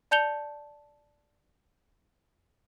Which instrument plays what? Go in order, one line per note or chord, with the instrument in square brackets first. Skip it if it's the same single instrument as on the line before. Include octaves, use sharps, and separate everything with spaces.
[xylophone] D5 A5 G6 C#7 F7 G7